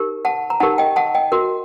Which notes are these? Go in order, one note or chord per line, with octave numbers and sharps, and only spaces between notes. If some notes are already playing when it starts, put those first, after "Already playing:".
Already playing: D#4 G4 A#4
F#5 A5
A#5
D#4 G4 A#4 F#5 A5
D#5 G5
F#5 A5
D#5 G5
F#4 A#4